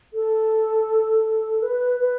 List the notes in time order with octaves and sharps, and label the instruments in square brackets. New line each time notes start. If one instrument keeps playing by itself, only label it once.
[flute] A4
B4
B4